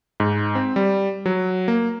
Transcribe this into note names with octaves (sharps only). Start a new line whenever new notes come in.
G#2
C4
G3
F#3
A#3